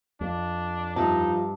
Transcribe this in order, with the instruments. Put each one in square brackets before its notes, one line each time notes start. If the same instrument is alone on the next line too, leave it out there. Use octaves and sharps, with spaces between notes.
[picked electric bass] F2 [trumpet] D4
[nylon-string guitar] G2 E5 A5 [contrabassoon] F3 [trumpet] D#4